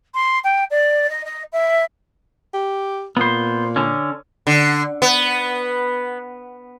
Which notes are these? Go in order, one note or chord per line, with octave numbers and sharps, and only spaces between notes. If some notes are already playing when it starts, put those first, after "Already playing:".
C6
G5
D5
D#5
D#5
E5
G4
A#2 B3 C5
D3 C#4
D3
B3